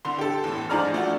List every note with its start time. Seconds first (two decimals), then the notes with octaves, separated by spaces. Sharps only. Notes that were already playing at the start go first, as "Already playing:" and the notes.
0.05 C2 D3 C6
0.18 G4 A4
0.44 E2 A2
0.69 G#2 F3 G#4 D5 A#5 F6
0.94 A3 D4 F#4